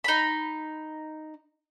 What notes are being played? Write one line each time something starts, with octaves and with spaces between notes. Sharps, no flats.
D#4 B5